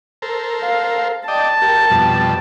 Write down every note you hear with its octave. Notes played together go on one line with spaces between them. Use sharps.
A4 A#4 C5
F5
D5 D#5 G5 A5
G4 A#4
F2 B2 G3